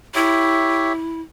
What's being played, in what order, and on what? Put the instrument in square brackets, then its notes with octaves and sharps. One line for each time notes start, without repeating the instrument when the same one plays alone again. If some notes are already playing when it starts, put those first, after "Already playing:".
[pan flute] E4 [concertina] G4 C#5 E5